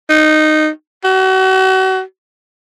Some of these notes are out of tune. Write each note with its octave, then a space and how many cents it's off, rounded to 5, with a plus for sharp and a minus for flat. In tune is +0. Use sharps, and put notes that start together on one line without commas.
D#4 -15
F#4 +35